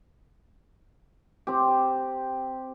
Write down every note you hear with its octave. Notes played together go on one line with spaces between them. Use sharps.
C4 G4